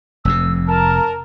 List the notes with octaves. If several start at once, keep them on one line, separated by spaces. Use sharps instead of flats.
F1 F2 C3 E6
A#4 A5